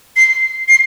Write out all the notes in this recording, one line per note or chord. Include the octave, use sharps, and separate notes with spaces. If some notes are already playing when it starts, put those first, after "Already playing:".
C7
C7